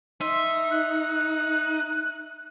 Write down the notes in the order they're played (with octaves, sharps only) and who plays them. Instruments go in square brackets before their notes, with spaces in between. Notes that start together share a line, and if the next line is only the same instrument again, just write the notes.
[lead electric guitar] D#4 [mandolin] E5 [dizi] C6
[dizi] F#6